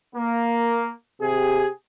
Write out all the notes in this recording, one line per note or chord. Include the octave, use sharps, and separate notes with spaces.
A#3
C3 G4 G#4